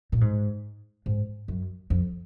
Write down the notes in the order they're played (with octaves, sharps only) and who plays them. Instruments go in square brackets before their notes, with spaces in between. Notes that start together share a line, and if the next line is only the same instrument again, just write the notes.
[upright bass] A#2
G#2
G#2
F#2
F2